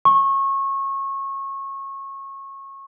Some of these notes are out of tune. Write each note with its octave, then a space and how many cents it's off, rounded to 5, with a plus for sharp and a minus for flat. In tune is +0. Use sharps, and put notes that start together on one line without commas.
C#6 -25